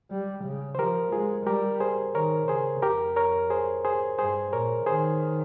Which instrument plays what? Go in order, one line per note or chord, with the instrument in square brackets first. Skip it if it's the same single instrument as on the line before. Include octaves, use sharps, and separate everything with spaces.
[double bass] G3
C#3
[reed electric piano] C5
[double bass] F3 [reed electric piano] G4 A#4
[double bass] G#3 [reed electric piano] F4 G#4
[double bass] G3 [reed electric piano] G4 A#4
[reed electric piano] G#4 C5
[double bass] D#3 [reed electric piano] A#4 C#5
[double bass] C#3 [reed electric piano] G#4 C5
[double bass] F2 [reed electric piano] G4 A#4
[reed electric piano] A#4 C#5
G#4 C5
G#4 C5
[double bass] G2 [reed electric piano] G#4 C5
[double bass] A#2 [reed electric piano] A#4 C#5
[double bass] D#3 [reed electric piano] G#4 C5